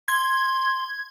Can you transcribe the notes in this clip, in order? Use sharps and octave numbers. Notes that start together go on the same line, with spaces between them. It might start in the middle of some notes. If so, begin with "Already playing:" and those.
C6 G#6